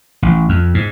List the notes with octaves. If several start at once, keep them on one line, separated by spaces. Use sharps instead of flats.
A1
F2
G#2